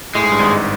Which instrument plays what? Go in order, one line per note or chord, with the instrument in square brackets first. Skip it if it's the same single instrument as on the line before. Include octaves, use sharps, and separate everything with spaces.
[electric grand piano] A2 [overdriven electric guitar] G#3
[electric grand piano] G#2
G2
G#1 G#2